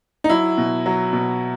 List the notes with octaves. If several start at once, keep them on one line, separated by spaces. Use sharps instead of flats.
D#4
F#3 E4
B2
F#3
B2